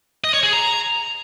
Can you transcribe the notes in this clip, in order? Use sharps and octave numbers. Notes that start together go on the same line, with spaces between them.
D#5
C#5
G#4
A#5